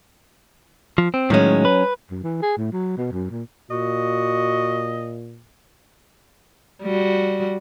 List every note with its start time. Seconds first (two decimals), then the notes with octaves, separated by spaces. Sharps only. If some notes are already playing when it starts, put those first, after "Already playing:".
0.98 F3
1.14 C4
1.30 A2 D#3 F#3 G#3 C#4
1.65 B4
2.11 F#2
2.24 E3
2.43 G#4
2.58 A2
2.73 F#3
2.98 B2
3.12 F#2
3.30 A#2
3.71 A#2 F#4 D#5
6.82 G3 F#4